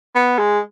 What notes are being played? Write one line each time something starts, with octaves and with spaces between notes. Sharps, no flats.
B3
G#3